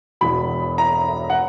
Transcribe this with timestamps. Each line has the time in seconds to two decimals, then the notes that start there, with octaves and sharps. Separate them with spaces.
0.21 E1 E2 B2 B5
0.78 A#5
1.30 F#5